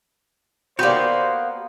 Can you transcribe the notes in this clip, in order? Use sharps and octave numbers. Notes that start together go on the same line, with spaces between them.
A#3 B3 F#4 G4 C5 D5 G6